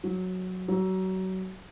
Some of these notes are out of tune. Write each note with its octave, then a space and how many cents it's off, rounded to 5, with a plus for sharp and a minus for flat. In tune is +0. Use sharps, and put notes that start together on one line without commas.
F#3 -5
F#3 +25